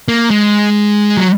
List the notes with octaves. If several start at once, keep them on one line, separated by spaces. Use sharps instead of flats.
A#3
G#3
F#3